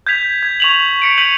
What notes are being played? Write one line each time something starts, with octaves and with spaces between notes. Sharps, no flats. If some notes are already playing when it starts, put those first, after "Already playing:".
G6 G#6 B6 F7
G#6
C#6 F7 F#7
B6 C#7 D7
G6 D#7 F#7